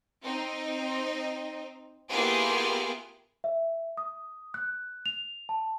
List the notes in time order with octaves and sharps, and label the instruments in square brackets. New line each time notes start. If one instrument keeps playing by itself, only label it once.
[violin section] C4 D#4
A#3 B3 E4 F4 G4 G#4
[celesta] E5
D#6
F#6
F7
A5